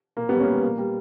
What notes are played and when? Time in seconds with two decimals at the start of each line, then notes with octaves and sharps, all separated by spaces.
0.17 A#2 A#3
0.29 G3 B3
0.39 A#3 C#4
0.52 G3
0.63 A#2 A#3
0.78 G3